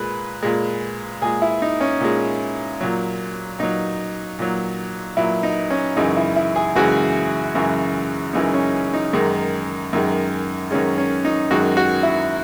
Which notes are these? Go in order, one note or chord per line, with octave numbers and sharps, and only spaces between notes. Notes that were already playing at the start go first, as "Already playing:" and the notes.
Already playing: A#2 G#3 B4
A#2 G#3
A#2 G#3 G#4
E4
D#4
C#4
A#2 G#3
A#2 F#3
A#2 F#3 D#4
A#2 F#3
A#2 F#3 E4
D#4
C#4
F#2 C#3 E3 G#3 D#4
E4
E4
G#4
F#2 C#3 E3 G#3 F#4
F#2 C#3 E3 G#3
F#2 C#3 E3 G#3 D#4
C#4
D#4
F#2 D#3 G#3
F#2 D#3 G#3
F#2 D#3 G#3 C#4
C#4
D#4
F#2 D#3 G#3 F#4
F#4
E4